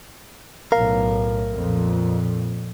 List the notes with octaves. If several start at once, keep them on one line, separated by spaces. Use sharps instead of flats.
B1 A2 A#4 F5
F2 A#2